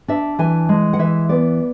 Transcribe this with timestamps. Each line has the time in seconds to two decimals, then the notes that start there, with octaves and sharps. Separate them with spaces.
0.08 D4 E5
0.39 E3 G#5
0.69 G#3
0.93 F#5
0.99 E3 E5
1.29 B3 D5